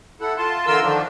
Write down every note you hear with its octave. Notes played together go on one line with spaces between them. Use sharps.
E4 A4 F#5
F4 A5 C6
D3 E3 F4 A#4 C6 E6
D3 D#3 F3 D4